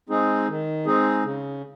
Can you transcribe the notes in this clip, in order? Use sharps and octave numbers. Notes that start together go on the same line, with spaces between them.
G#3 C4 D#4 G#4
D#3
G#3 C4 D#4 G#4
C#3